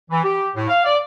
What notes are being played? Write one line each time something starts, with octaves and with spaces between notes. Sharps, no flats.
E3
G4
A2
F5
D5